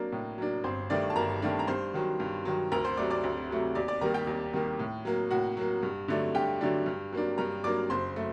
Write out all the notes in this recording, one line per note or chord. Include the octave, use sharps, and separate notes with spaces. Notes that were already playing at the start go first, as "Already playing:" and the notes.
Already playing: F#3 A#3 D4
A2
F#3 A#3 D4
G1 C4 C5
G2 D#3 A3 D4 D5
A5
G1 A#4 A#5
G2 D#3 A3 D4
A#5
G2 C5 C6
D#3 F#3
G2
D#3 F#3
D2 A#4 A#5
C5 C6
C3 F#3 A3 D5 D6
D5 D6
D2
C3 F#3 A3
D#2 D5 D6
D5 D6
D#3 G3 A#3 A#4 A#5
G4 G5
D#2
D#3 G3 A#3
A2
F#3 A#3
A2 F#4 F#5
F#3 A#3
G2
D3 F#3 A3 D4
G2 G4 G5
D3 F#3 A3 D4
G2
F#3 A#3 D4
G2 A#4 A#5
F#3 A#3 D4 D5 D6
F#1 C5 C6
F#3 A3